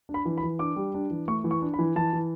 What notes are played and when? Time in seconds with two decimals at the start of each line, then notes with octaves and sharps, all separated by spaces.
0.09 D4
0.14 B5
0.25 E3
0.38 B5
0.43 E3
0.59 D4 D6
0.76 G3
0.94 D4
1.11 E3
1.28 A3 C#6
1.44 E3
1.51 C#6
1.62 D4
1.74 B5
1.79 E3
1.96 E3 A5
2.13 E3